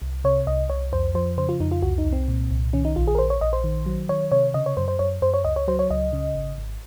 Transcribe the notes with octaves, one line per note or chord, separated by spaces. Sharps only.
C2
C3 C#5
C2 D#5
C2 C#5
F2 C5
F3 C5
C#3 C5
F4
F2 D#4
F4
C2 F#4
D#4
C2
C4
A#2
C2
D#3 C#4
D#4
A#1 F4
G#4
A#4
A#1 C5
C#5
A#1 D#5
C5
D#3
F#3
D#3 C#5
C3 C#5
C#3 D#5
C#5
F#2 C5
C5
F#2 C#5
F#2 C5
C#5
C#2 D#5
C#5
F#3 C5
C#5
C#2 D#5
C#3
G#1
G#1